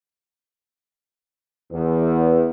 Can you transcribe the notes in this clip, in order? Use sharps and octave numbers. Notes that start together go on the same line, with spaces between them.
E2